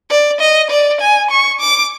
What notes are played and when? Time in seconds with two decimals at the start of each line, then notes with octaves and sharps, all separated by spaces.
0.10 D5
0.40 D#5
0.70 D5
1.01 G#5
1.31 C#6
1.61 D6